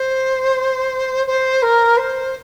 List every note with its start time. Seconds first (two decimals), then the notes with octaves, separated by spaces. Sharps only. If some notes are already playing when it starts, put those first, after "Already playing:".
Already playing: C5
1.26 C5
1.62 A#4
1.97 C5